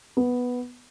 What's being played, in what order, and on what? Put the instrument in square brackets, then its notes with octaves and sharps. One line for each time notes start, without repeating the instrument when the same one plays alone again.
[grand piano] B3